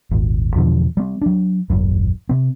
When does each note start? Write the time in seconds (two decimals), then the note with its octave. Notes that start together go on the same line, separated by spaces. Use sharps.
0.11 D#1 G#1
0.56 E2 B2 D3 F3
0.97 G3 C4
1.21 F#3 D4
1.70 D#1 G#1 F#2
2.29 C3 C4